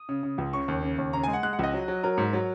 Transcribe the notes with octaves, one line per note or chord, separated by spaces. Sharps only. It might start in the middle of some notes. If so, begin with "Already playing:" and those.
Already playing: D#6
C#3
C#3
C#2
C#3 C#6
D#2
C#3
D#2
C#3 A#5
G#3 G#5
F#5
G#3 F#6
F#5
C#2 D#5
F#3
F#3
F#3 A#4
G#2
F#3